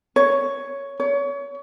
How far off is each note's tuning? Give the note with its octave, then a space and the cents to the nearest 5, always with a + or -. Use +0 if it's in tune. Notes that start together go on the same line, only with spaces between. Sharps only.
C#5 +5
C#5 +30